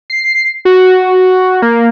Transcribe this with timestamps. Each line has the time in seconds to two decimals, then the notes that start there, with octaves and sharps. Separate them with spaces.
0.10 C7
0.65 F#4
1.62 A#3